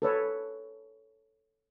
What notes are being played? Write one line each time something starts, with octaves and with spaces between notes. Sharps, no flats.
A4 B4 C#5